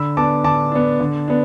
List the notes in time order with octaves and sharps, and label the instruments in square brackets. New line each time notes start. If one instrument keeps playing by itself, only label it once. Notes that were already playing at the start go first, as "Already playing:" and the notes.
Already playing: [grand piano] D3 B5 E6
B3 D4 A5 D6
D3 A5 D6
B3 D4
D3
B3 D4